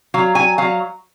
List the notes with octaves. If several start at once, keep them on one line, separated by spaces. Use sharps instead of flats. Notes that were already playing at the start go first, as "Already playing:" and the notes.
F#3 F5
F#3 G#5
F#3 F5